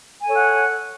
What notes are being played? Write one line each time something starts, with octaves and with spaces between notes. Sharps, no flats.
A4 C#5 F#5 G#5